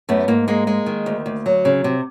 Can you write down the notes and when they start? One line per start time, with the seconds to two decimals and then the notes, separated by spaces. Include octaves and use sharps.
0.09 F#2 A3 B3
0.28 G#2 A#3
0.48 G#3 A#3
0.67 G#3
0.86 D#3
1.06 D2
1.26 D2
1.46 F#3
1.65 C#3
1.84 C3